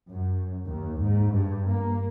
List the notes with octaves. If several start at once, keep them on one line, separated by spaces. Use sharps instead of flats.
F#2
D#2
G#2
G2
A#3